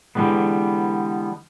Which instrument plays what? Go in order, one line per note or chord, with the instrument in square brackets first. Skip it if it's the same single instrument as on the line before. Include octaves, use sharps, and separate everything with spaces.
[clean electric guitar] D3 E3 G3 G#3 B3